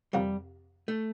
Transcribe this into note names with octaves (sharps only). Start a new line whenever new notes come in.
F2 C3 F3 G3 A#3
A3